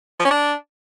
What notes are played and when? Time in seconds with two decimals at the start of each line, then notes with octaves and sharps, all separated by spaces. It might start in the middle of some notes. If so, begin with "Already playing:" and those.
0.19 F3
0.25 C#4
0.31 D4